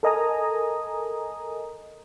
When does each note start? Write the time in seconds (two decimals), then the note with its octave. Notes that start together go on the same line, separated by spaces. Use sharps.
0.03 A4 A#4 D#5 G#5 A#5 D#6